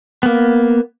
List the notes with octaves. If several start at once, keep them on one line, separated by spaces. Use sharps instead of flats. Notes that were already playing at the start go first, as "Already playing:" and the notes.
A#3 B3